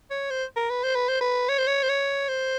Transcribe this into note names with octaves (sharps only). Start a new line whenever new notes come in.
C#5
C5
A#4
B4
C5
B4
C5
B4
C#5
C5
C#5
C5
C#5
C5